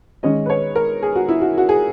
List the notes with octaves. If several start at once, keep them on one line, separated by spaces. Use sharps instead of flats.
D#3 G#3 C#4 D#5
B4
C#5
A#4
G#4
F#4
E4
F#4
F#4
G#4